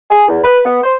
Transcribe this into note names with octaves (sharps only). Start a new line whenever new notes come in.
G#4
E2
B4
B3
C5